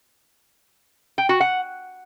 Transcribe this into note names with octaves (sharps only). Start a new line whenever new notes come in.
G5
F#4
F#5